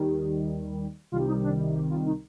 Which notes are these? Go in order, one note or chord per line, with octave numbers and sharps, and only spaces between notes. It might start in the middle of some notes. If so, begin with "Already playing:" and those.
Already playing: D#2 D#3 G3
C2 C3 D#3 G3 F4
D#4
D4
G4
F4
D#4